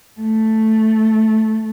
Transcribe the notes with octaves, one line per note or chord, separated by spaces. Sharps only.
A3